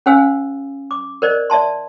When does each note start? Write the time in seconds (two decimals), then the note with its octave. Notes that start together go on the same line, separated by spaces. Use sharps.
0.06 C#4 G4 C5 F5 G#5 E6
0.91 D6
1.22 A#4 C5 D5 D#5
1.50 D5 E5 A5 C6